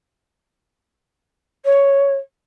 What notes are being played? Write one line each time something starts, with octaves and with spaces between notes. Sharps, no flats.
C#5